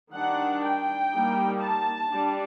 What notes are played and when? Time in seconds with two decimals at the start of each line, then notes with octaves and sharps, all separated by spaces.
0.13 D#3 G3 D4 F#5
0.63 G5
1.12 G3 A#3 D#4
1.60 A5
2.09 G3 D4